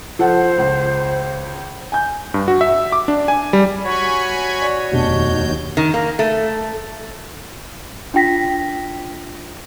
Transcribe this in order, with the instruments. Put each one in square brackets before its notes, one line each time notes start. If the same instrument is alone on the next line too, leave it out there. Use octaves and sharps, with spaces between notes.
[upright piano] F3 A4 F#5 [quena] C5
[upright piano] C#2
G#5 G6
[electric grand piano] G2
F#4
E5
D6
D4
G#5
G3
[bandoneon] F#4 C#5 [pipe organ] G#5 B5 C#6
[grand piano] D5
[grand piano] F1 B2 D4 [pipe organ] D#2 G6
[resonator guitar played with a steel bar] D#3
A#3
A3
[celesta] D4 F4 G5 A#6 B6